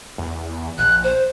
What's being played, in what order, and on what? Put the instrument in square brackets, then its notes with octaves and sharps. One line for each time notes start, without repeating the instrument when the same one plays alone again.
[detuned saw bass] E2
[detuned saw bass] A#1 [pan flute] F#6
[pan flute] C5